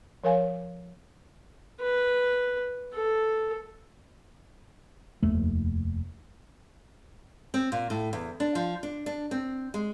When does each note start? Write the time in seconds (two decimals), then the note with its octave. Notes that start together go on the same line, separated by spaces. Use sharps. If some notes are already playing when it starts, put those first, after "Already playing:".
0.24 F3 A#4 C#5 F5 G#5
1.81 B4
2.94 A4
5.23 F1 D#2 A3
7.54 C4
7.72 A#2
7.90 A2
8.13 E2
8.40 D4
8.55 F3
8.83 D4
9.06 D4
9.31 C4
9.74 G#3